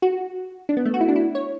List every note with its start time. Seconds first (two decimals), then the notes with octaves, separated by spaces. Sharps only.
0.02 F#4
0.69 D4
0.77 B3
0.86 A3
0.94 F#4
1.01 E4
1.08 D4
1.16 E4
1.35 C#5